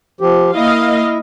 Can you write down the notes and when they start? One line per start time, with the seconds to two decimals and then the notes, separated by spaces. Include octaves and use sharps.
0.21 F3 G4
0.54 A#3 E4 D#5 F5